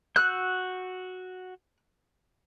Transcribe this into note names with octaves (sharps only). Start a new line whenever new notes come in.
F#4 E6 F#6 G6